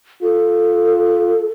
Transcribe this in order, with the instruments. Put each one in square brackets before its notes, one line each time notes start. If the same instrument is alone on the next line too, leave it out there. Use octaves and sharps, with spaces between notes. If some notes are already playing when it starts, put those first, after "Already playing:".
[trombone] F4 [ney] A4